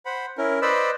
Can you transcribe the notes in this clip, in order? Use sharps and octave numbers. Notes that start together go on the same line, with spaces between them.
C5 F#5 B5
C#4 E4 A#4
B4 C5 D5 D#5 B5 E6